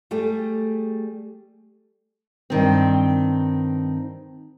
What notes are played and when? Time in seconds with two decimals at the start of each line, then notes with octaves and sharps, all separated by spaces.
0.11 G3 A3 G4 G#4
2.50 G2 D#3 C4